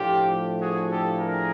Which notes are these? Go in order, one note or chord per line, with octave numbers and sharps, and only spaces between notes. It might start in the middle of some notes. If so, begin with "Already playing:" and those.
Already playing: A2 F3 A3 D4 F4 G4
F#4 G#4
G4 A4
G#4 A#4